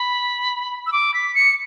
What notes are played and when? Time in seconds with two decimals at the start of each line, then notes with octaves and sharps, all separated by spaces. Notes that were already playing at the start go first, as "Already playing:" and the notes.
Already playing: B5
0.87 E6
0.92 D6
1.14 B6
1.35 C#7